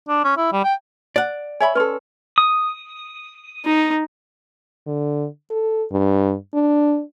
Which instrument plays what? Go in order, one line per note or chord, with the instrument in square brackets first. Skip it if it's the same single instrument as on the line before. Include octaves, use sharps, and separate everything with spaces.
[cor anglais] D4
C#4
E4
G3
G5
[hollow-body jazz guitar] D5 F#5
[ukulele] C#5 E5 B5 [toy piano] G#5
[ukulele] C#4 A4 [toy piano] B4 C6
[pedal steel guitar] D#6
[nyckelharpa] D#4
[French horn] D3
A4
G2
D4